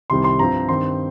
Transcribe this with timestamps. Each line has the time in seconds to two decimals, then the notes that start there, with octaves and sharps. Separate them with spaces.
0.10 C2 C3 D#3 G3 C4 C6
0.24 C6
0.39 G2 F3 C4 A#5
0.69 G2 D#3 C4 C6